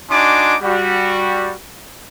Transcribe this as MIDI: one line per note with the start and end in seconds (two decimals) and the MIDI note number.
0.10 0.55 62
0.10 0.55 63
0.10 0.55 66
0.10 0.55 80
0.10 0.55 84
0.10 0.55 86
0.62 1.53 55
0.62 1.53 66